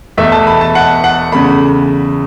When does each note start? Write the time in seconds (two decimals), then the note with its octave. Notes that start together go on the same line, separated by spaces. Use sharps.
0.18 E2 B2 A3 E5
0.32 A5
0.47 B5
0.61 A5
0.75 F#5
1.04 F#5
1.32 E2 C#3 A3 B5